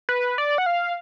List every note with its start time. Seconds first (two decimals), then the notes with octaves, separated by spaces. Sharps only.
0.09 B4
0.38 D5
0.58 F#5
0.66 F5